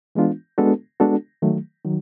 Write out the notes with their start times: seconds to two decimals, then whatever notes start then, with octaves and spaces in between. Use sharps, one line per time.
0.15 E3 G#3 B3 D4 F4
0.58 G#3 B3 D4 F#4 A4
1.00 G#3 B3 D4 F#4 A4
1.42 D#3 F#3 A3
1.85 D#3 F#3